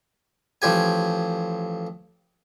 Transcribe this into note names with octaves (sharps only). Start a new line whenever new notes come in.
A1 F3 G4 G#5